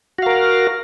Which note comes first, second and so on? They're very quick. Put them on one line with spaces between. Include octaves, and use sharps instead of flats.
F#4 F5 A#4